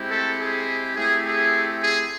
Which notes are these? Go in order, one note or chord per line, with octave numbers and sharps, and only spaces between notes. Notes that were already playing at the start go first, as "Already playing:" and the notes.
Already playing: G#3 C4 E4 G4
A3 A4
G#4
A3 C4 E4 G4 G#4
G#4
G#4